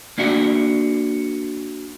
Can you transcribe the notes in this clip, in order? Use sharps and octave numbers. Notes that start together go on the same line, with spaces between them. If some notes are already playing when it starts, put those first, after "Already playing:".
A#3 D4 F#4 E5